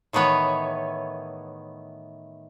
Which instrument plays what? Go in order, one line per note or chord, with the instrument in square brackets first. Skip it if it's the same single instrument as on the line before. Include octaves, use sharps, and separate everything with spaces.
[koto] A2 D#3 E3 B3 C#5